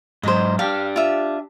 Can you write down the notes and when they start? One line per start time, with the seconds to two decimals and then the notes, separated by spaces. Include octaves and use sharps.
0.23 G#2 F#3 C5 D#5
0.59 D4 G4 F5
0.96 F4 E5